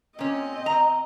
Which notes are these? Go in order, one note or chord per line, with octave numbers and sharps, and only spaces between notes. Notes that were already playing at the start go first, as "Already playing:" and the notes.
A#2 C4 C#4 D#5
A#5